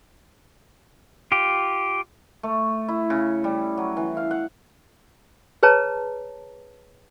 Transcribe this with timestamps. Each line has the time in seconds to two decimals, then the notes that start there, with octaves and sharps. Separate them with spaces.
1.32 F4 G4
2.43 A3
2.88 E4
3.10 C#3
3.44 G3
3.77 F#3
3.97 E3
4.17 F5
4.31 F#5
5.63 G#4 B4 C#5 A5 A#5